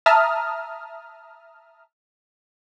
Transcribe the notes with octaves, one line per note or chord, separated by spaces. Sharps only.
E5 A5 A#5 D#6 F6